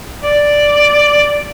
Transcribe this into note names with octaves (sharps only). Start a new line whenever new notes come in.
D5